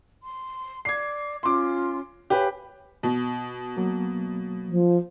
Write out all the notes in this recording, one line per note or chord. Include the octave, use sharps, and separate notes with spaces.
C6
D5 D6 G#6 C7
C#4 F4 C6 D6
G4 B4 C#5 F5 G#5
B2
F#3 A#3
F3